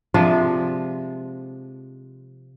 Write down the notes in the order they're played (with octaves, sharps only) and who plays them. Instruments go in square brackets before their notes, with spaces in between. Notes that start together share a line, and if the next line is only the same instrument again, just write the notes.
[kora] C3 F3 G#3 D4